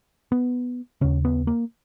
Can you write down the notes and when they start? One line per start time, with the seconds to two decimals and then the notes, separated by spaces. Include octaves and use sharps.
0.32 B3
1.01 D#2 C#3 C#4
1.25 B3
1.47 A#3